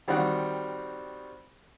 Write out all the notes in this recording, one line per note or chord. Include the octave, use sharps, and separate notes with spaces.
D#3 G3 C4 F#4 F#5